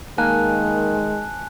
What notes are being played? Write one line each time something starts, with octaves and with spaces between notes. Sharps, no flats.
D#3 G#3 A#3 G#5 A5 F#6